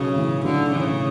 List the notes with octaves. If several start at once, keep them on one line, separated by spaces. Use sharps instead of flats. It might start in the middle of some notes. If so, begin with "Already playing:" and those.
Already playing: B1 C#3
A2 E3
B1 D3
A2 C#3 E3